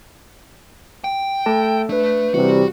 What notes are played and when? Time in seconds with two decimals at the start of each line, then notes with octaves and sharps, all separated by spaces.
1.04 G5
1.46 A3 A4 A5
1.89 A3 D4 B4
2.34 C3 E3 G3 F#4